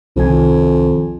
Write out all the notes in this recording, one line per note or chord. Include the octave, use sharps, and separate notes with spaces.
C2 F2 D#3 G#5